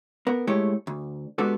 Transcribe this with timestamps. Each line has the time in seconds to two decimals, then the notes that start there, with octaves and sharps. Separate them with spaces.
0.27 B3 A#4
0.47 G#3 A3 E4 G4 C#5
0.87 D2
1.38 G#3 B3 D4 F#4 G4 A4